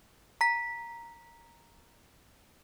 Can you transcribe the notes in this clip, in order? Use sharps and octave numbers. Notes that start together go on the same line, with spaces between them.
A#5 B6